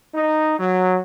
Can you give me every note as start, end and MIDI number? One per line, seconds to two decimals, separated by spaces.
0.15 0.55 63
0.59 0.99 54